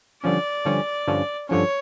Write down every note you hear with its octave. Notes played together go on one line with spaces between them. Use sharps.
G2 D3 F3 C#4 D5
G2 D3 F3 C#4
G2 D3 F3 C#4
G2 D3 F3 C#4 C#5